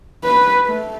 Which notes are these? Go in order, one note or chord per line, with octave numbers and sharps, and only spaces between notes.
B4
A3